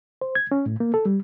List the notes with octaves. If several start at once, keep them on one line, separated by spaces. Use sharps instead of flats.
C5
G#6
C#4
A2
A#3
A4
G3